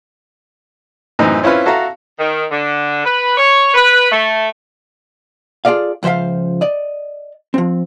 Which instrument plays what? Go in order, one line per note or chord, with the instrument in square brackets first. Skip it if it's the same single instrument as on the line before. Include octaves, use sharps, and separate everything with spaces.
[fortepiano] F#2 A2 E3 C4 D#4
C4 C#4 E4 F4 B4
F#4 A4 E5 F5 A#5
[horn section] D#3
D3
B4
C#5
B4
A3
[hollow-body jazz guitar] F4 G#4 A4 D5 F5
C#2 F3 C5 E5 F5
D5 D#5
F3 C4